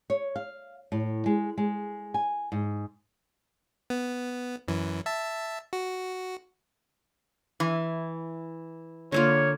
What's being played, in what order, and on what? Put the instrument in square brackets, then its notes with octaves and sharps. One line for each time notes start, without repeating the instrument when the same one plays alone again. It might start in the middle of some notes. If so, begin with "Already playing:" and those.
[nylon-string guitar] C#5
F5
A2
G#3
G#3
G#5
G#2
[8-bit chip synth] B3
F#2 E3
E5 A5
F#4
[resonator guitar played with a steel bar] E3
[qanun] D3 A#3 F4 [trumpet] C#5